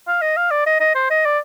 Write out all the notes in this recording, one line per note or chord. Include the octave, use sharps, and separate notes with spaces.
F5
D#5
F5
D5
D#5
D#5
C5
D#5
D5